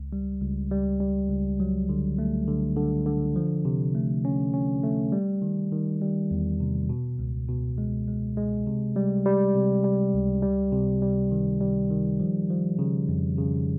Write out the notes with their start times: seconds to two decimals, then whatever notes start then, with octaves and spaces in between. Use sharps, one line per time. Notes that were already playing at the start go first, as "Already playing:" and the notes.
Already playing: C#2
0.13 G3
0.42 C#2
0.71 G3
1.00 G3
1.29 C#2
1.60 F#3
1.89 D3
2.19 A3
2.48 D3
2.77 D3
3.07 D3
3.36 F3
3.65 C3
3.95 A3
4.25 C#4
4.53 C#4
4.83 A3
5.12 G3
5.42 D#3
5.72 D#3
6.01 G3
6.31 E2
6.60 C3
6.89 B2
7.19 C#2
7.49 B2
7.78 G#3
8.08 G#3
8.37 G#3
8.66 C3
8.96 G3
9.25 G3
9.55 C3
9.84 G3
10.14 C#2
10.43 G3
10.72 C3
11.02 G3
11.31 D#3
11.61 G3
11.90 D#3
12.20 F3
12.50 F3
12.79 C#3
13.09 F2
13.38 C#3